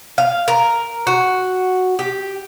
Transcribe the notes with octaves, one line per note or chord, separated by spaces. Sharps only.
F5
A#4
F#4
G4